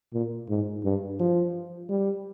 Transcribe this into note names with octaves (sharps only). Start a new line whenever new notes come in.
A#2
G#2
G2
F3
G3